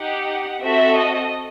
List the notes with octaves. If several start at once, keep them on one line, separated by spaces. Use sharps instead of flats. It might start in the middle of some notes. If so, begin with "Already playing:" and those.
Already playing: D#4 G4 F#5
C4 F#4 A4 E5
D#5